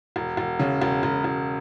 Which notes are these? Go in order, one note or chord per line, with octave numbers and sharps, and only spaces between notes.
E1
E1
C#3
E1
E1
E1